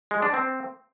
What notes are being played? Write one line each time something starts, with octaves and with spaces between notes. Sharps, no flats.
G#3
D4
C4